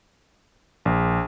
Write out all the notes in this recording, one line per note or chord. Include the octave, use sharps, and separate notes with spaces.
A#1